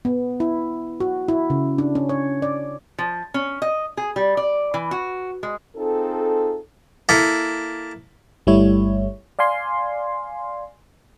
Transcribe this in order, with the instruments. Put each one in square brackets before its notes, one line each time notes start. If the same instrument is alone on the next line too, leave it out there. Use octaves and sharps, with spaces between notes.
[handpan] B3
E4
F#4
E4
C#3
D4
C#4
C#5
D5
[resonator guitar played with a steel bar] F3
C#4
D#5
G#4
G3
D5
E3
F#4
G#3
[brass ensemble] C4 D#4 F4 G#4 A4
[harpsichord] A#3 E4 A4
[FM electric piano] G1 G3 A3 E4 C#5
D5 F5 G#5 C6